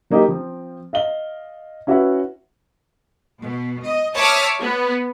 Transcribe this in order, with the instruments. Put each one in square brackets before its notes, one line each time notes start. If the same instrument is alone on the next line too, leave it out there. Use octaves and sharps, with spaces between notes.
[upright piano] F#3 A#3 D#4 G4
F3 C4
D#5 F5 G7
C#4 E4 F#4 B4 E5 F#5
[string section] B2
D#5
C#5 E5 A5 D6 D#6 F6
B3